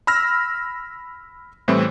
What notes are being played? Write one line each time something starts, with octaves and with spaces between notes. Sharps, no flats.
B5 E6 F6 A#6
A2 E3 G3 C4